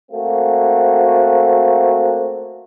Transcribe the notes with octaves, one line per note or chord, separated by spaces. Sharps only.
A3 A#3 C4 F#4